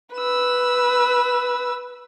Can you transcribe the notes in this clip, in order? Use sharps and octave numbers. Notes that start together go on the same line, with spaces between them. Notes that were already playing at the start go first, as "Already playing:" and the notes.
B4 E6